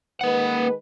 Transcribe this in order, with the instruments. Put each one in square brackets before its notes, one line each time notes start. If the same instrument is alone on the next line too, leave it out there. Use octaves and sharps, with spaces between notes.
[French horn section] D#3 G#3 B4 [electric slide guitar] A#3 F#5